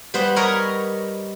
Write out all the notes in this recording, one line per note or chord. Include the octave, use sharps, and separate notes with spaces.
G3 B3 B4 C5
A#4 B4 C#5 D#5 A#5